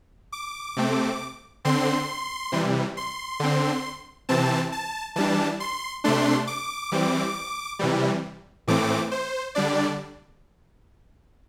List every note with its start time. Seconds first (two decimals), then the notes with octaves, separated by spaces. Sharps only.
0.32 D6
0.77 C3 A3 C4
1.65 D3 C4 C6
2.52 C3 E3 G3
2.97 C6
3.40 D3 C4
4.29 C3 E3 C4 A5
4.72 A5
5.16 E3 G3 D4 A5
5.60 C6
6.04 C3 A3 D4 C6
6.47 D6
6.92 E3 G3 C4
7.79 C3 E3 G3
8.68 A2 E3 A3 C4 D6
9.11 C5
9.55 D3 G3 D4 D5